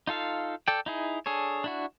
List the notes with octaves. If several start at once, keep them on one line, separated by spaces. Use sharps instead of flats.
D#4 F4 A4 F5
A4 D5 G5
D#4 E4 G#4
D4 G#4 A4 C#5
D4 E4 F#4